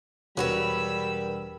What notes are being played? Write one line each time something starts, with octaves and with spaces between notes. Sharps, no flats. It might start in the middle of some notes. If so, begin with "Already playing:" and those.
E1 G3 C#4 F#4 A#4 B4 B5 E6